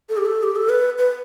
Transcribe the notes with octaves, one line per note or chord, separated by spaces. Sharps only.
A4
G4
A4
G4
A4
B4
B4